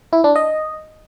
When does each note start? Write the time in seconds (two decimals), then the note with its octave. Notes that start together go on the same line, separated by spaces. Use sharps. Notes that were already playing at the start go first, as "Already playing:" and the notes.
0.13 E4
0.24 D4
0.36 D#5